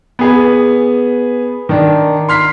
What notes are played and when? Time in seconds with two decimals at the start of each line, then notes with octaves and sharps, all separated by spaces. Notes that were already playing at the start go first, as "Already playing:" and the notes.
0.19 B3 G#4 B4
1.69 D#3 D4
2.29 C6 F6 B6 C7